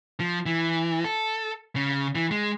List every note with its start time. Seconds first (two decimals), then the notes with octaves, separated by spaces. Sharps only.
0.20 F3
0.46 E3
1.04 A4
1.76 C#3
2.15 E3
2.31 G#3